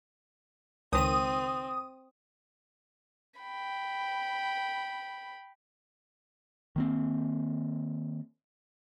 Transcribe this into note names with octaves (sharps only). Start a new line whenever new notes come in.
C#2 D#3 C4 D#6 D#7
G5 B5
D#3 A#3 C4